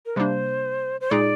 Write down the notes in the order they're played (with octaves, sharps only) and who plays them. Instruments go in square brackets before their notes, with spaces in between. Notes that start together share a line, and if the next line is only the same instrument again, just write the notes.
[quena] A#4
[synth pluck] C3 G3 A#3 D4 [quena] C5
[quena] C5
[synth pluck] A#2 G#3 D#4 G#4 [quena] D5